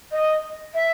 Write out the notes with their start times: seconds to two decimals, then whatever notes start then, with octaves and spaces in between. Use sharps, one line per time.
0.11 D#5
0.74 E5